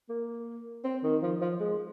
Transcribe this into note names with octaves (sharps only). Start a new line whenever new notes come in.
A#3
C4
D#3
F3
F3
G#3